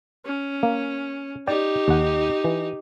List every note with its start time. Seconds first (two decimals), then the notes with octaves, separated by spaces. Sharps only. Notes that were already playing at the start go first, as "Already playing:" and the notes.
0.25 C#4
0.63 A#3
1.47 D#4 G4 D5 G5
1.88 D#2 F#5
2.44 E3